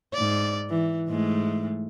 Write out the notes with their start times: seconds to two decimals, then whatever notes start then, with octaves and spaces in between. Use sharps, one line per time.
0.13 G#2 D5
0.70 E3
1.08 G#2 G#3 A3